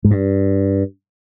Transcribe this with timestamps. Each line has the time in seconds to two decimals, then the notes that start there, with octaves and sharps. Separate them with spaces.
0.04 G#2
0.11 G2